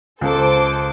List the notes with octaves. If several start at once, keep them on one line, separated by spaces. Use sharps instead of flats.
C#2 A4 C5 D6